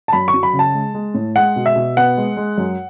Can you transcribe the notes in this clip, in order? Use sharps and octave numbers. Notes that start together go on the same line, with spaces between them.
A5
F#2 B5
C#6
F#3
B5
C#3
A5
G#3
G#3
A2
G#3 F#5
B2
E5
B2
B3 F#5
G#3
G#3
F#2